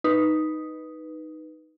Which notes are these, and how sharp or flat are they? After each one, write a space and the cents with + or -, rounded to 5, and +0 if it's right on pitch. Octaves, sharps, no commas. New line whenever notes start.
D#4 +0 B4 -5